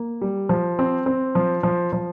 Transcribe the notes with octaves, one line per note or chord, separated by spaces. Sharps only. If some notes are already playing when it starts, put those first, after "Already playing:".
Already playing: A#3
G3
F3
C4
C4
F3
F3
F3